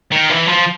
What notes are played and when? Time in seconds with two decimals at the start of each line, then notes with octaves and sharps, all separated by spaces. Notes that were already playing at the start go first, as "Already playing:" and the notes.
0.12 D#3
0.30 E3
0.47 F3